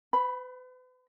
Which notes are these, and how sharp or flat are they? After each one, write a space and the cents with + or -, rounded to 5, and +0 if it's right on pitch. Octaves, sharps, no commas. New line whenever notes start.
B4 +40 B5 +0